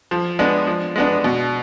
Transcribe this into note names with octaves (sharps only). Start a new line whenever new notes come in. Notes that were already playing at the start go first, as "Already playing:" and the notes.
F3
G#3 B3 D4
F3
G#3 B3 D4
B2